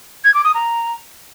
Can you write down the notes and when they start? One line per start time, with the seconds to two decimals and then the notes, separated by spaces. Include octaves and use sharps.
0.24 G#6
0.34 D6
0.44 D#6
0.54 A#5